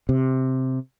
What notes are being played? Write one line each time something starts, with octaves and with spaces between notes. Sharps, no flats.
C3